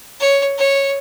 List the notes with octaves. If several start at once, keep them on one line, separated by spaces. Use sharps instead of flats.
C#5
C#5